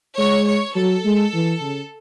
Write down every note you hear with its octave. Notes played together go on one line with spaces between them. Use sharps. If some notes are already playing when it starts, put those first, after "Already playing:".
G#3 C#5
C#5
F#3 A4
G#3
E3
C#3